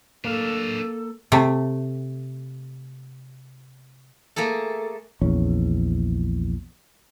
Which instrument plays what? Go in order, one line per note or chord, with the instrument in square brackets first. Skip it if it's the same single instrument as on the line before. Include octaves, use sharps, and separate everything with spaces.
[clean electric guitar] A#3 [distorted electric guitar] D4 F5 [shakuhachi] A4
[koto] C3 A3
[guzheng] A3 A#3 G#4 A4
[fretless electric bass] A#1 E2 C#4